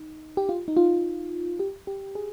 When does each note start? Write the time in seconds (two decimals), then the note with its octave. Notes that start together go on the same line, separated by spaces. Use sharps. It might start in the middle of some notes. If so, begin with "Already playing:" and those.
Already playing: D#4
0.37 G4
0.49 F4
0.68 D#4
0.77 F4
1.59 G4
1.87 G4
2.15 G#4